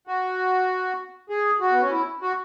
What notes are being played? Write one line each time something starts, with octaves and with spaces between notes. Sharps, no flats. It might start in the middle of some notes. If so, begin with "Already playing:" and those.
F#4
G#4
F#4
B3
C#4
E4
F#4